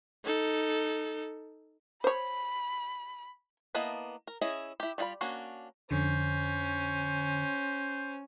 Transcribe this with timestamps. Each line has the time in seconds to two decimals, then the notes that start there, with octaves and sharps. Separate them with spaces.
0.24 D#4 A4
2.04 C5 C#5 B5
3.75 A#3 B3 E4 D#5 A5
4.27 A#4
4.41 C#4 E4 G#4 D#5
4.80 E4 G4
4.98 G3 D#4 F4 D5 B5
5.21 A#3 C#4 D4 F#4
5.91 F2 D3 C#4 C5